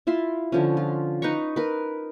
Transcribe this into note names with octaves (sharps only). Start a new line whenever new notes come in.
E4 F4 E5 C6
D3 F3 C#4
F4
D#4 B4 A#5 C#6
A#4 B4